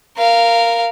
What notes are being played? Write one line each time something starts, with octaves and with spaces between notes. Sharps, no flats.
A#4 F5